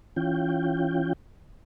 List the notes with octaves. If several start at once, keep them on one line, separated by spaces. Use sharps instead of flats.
E3 C#4 F4 G5